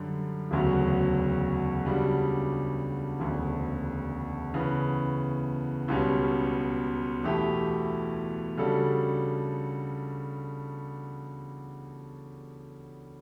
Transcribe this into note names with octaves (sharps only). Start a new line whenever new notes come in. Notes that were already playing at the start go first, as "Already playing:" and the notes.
Already playing: F#2 D3 G3
E1 D2 C#3 F#3
C#3 G3 D4 F#4
E1 D2 C#3
C#3 E3 B3
C#2 B2 G3 C#4
E2 B2 A3 E4 G4
C#3 G3 D4 F#4 A4